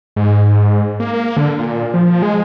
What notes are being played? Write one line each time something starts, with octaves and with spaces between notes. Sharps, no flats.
G#2
A#3
A#3
D3
A#2
F3
G#3